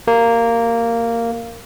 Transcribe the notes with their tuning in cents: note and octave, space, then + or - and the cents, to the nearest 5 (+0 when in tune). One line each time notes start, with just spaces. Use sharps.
A#3 -10 G4 -20